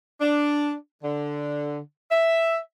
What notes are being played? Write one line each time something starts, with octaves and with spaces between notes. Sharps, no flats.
D4
D3
E5